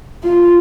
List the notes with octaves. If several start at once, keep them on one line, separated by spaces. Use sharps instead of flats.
F4